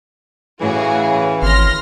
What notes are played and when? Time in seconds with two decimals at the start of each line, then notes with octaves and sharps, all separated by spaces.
0.61 A2 C#3 E3 F#4 G#4
1.42 G#1 C6 F6 A#6